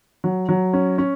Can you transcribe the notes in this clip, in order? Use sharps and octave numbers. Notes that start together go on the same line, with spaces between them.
F#3
F#3
C#4
C#4